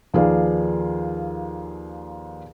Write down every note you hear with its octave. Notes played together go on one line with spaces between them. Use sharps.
D#2 F3 G#4 B4 D5 F5